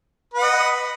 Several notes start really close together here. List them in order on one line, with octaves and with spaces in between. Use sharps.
B4 F#5 D#5